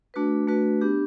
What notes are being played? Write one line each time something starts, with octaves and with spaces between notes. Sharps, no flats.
A3 D4 F#4 B4
A3 D4 F#4 B4
B3 D4 G4